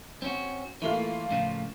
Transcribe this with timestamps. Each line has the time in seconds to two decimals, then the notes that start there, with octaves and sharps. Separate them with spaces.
0.22 C4 C#4 F#4
0.82 E3 A3 A#3 F4
1.30 A2 C#3 F3